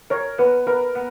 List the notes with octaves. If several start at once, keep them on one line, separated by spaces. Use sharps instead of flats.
A#4 C#5
B3 B4
A#4 B4
B3